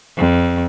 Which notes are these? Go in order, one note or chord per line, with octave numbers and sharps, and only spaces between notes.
F2